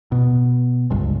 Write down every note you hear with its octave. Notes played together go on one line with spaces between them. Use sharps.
B2
G1 C#2